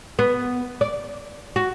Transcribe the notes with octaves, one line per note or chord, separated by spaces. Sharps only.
B3
D5
F#4